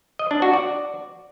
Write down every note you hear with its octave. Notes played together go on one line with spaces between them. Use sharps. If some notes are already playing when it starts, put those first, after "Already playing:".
D#5
D4
F#4
D5